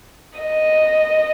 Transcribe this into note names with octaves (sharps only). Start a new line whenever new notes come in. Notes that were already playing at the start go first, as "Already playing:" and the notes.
D#5